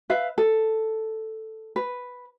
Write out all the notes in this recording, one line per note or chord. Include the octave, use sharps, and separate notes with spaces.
B4 E5 F5
A4
B4